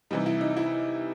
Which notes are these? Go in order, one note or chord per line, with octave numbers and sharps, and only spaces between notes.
C3 E3 G3 D#4
E4
D#4
E4